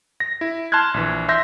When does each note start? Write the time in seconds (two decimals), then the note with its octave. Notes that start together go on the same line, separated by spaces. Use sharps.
0.20 A#6
0.41 E4
0.72 A5 C6 F6 F#6 G#6
0.94 A#1 E3
1.29 E5 C6 G6 A#6